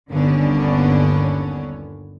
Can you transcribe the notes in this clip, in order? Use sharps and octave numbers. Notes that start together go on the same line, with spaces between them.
G1 D#2 D3 B3 C#4 D4